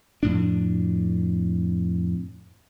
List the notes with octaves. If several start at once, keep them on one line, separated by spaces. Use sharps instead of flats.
F2 A2 D4